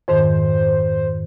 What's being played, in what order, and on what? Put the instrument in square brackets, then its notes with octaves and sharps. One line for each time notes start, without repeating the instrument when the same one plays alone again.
[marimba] F2 G#2 D#3 [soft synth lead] C5